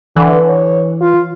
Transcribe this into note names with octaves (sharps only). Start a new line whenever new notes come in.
D3 E3
C#5
F4